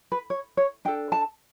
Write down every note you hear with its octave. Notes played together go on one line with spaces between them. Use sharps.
B4
C#5
C#5
D4 A4 G5
A5